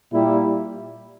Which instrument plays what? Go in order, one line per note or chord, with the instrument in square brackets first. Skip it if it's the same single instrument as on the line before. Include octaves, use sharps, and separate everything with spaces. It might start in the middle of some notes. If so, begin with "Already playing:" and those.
[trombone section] A#2 G3 A#3 E4 G4